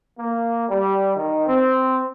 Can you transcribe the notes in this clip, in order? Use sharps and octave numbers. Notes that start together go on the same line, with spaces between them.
A#3
G3
D#3
C4